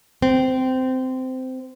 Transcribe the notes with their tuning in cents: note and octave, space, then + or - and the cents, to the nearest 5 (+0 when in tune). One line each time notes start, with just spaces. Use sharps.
C4 -15